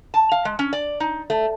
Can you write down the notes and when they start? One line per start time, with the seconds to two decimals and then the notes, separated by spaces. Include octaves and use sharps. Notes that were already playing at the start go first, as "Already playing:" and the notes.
0.14 A5
0.32 F5
0.45 G#3
0.59 C#4
0.73 D5
1.00 D#4
1.30 A3